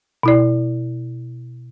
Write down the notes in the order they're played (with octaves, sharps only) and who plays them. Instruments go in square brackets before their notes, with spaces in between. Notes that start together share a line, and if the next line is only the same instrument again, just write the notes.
[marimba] B2 E4 D5